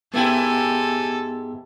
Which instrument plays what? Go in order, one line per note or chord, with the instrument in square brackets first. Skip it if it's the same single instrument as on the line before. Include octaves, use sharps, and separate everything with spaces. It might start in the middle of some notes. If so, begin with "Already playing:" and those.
[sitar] G#2 E4 [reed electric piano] B3 G5 [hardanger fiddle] G4 G#5 [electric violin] A4